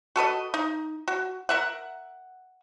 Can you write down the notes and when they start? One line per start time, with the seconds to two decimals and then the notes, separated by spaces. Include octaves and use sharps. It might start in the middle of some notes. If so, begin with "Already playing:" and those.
0.16 F#4 A4 B4 D#5
0.54 D#4
1.08 F#4
1.49 A#4 E5 F#5